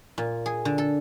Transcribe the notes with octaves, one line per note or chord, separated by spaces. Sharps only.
A#2
G#4
D3
A4